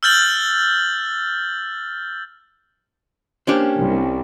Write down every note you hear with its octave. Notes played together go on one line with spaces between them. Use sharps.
E6 F6 G6 A6 F#7 G7
A#3 C#4 D4 G4 C5
C2